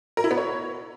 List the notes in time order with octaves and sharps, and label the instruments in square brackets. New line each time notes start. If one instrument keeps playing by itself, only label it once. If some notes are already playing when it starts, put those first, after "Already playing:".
[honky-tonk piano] A#4
E4
B3
C#5